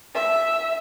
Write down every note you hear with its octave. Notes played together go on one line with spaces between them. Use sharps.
E5